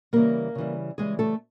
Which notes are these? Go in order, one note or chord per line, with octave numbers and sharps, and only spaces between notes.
C#3 E3 G3 A#3 A#4
C#3 E3 G3
C#3 E3 G3 G#3 G#4
A3 A4